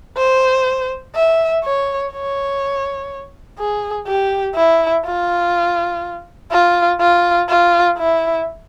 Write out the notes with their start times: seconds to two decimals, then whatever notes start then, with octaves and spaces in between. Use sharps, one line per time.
0.17 C5
1.15 E5
1.64 C#5
2.13 C#5
3.59 G#4
4.08 G4
4.56 E4
5.06 F4
6.52 F4
7.00 F4
7.49 F4
7.98 E4